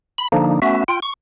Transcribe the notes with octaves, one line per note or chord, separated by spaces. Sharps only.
B5
D3 F3 A#3 D4 D#4
A3 B3 C#4 F#4 E5
F4 G5
C#6